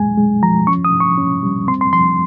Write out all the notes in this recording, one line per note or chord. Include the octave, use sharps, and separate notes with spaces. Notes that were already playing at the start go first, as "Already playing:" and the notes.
Already playing: F2 A#2 G#3 G#5
G#3
F3 A#5
C#4 C#6
D#6
G#2
C#6
C#4
G3
C4 C6
C6
F3 C6